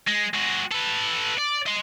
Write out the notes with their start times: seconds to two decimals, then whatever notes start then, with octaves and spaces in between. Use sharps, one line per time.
0.08 G#3
0.34 G#3 F#4
0.72 A4 B4
1.38 D5
1.67 D#5 C6